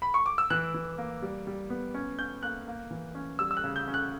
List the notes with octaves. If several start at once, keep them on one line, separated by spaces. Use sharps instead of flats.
B5
C#6
D6
E6
E3 F#6
E3
A#3
G3
G3
B3
C#4
C#4 G6
A#3 F#6
A#3
E3
C#4
G3 E6
E6
F#6
C#3
G6
C#4
F#6